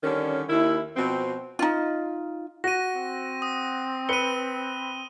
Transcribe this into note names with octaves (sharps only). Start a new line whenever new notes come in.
D3 D#3 G3 C#4
D#2 D#3 E4
B2 F3 C4
D#4 F4
F#4 A#6 D#7
C4
D#6
B4 C#7 D#7 G7